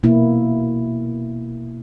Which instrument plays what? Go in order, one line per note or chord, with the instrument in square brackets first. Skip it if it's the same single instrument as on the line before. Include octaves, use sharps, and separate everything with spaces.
[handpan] B2 A#3 E4